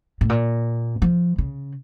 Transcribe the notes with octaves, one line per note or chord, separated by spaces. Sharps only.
A2
A#2
F3
C#3